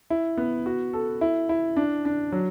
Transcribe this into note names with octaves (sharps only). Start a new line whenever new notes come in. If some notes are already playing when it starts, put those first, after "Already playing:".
E4
B3
F#4
A4
E4
E4
D4
D4
F#3